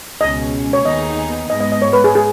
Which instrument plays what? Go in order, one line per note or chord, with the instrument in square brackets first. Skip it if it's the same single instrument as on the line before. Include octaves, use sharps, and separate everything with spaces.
[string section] C#2 B2 G#3 C#4 [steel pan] D#5
[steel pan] C#5
[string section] D#2 D#3 B3 D#4 G#4 [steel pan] D#5
[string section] G#2 G#3 B3 [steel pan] D#5
[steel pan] D#5
D#5
C#5
B4
G#4
G#4